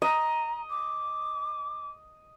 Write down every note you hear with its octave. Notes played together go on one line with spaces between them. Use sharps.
D#5 A#5
D6